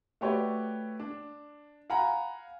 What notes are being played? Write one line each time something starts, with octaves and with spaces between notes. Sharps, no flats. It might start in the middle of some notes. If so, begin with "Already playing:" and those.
A3 F#4 G4 B4 C#5 D5
D4
F5 F#5 G#5 A#5 B5